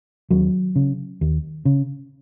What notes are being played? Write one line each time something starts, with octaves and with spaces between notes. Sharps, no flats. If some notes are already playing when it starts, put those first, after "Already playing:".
D#2 F#3
C#3
D#2
C#3